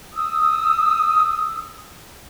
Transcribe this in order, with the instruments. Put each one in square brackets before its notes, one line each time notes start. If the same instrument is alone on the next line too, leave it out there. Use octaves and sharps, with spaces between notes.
[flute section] D#6 E6